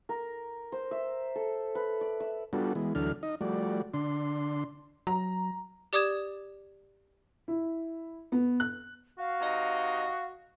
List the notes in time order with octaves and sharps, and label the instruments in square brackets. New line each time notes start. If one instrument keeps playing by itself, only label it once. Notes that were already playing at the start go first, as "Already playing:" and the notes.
[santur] A#4
C5
E5
A4
B4
D5
E5
[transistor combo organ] G3 B3 D4 F4 F#4 A4
E3 G#3 B3
D2 E3 F#3 D4 A4 F6
D#4 D#5
F3 G3 A3 F#4 D5
D3 D4 C6
[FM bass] F#3 [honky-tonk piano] A#5
[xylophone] G4 D5 D6 D#6 G#6 E7
[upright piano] E4
B3
F#6
[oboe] F#4 [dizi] F5
[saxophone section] C3 D#4 D#5